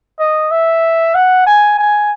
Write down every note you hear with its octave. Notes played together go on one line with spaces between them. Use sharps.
D#5
E5
F#5
G#5
G#5